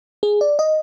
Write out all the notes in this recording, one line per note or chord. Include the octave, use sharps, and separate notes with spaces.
G#4
D5
D#5